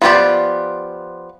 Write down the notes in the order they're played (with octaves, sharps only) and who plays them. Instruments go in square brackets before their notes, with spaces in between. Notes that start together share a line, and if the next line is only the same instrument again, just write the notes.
[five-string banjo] F3 B3 F4 G4 D5